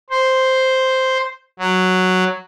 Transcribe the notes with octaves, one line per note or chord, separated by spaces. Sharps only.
C5
F#3